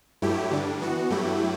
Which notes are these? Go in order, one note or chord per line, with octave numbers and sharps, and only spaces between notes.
G2 F#3 A3 E4 G4
G2 D3 G3 D4
E3 B3 F#4
G2 F#3 A3 E4 G4